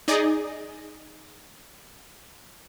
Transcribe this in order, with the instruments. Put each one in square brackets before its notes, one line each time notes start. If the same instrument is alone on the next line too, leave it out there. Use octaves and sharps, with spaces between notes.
[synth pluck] D#4 G#4 D5 D#5